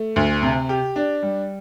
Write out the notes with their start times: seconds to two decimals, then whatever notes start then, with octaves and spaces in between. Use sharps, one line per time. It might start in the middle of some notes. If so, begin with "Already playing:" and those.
Already playing: A3
0.16 D2
0.43 C3
0.69 G4
0.96 D4
1.23 G3